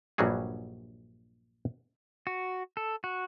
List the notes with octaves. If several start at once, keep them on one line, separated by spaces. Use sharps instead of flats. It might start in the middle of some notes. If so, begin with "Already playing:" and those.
A#1 G2 F#3 G3 F#4 G#4
F#4
A4
F#4